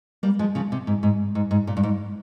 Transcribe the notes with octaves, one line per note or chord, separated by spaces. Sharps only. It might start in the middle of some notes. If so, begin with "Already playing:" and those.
G3 A#3
F3 G#3
C#3 F3
C3
G#2
G#2
G#2
G#2
A#2
G2
G#2